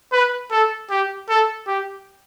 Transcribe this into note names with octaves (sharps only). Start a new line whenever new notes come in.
B4
A4
G4
A4
G4